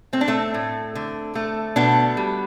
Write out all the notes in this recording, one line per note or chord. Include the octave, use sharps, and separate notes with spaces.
A3 C4
D4
A3 C4
A2
D3
A3
B2 B3 D4
G3